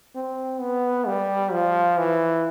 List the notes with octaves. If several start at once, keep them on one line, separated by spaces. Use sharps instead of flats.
C4
B3
G3
F3
E3